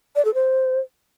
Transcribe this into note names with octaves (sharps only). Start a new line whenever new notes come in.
D5
A4
C5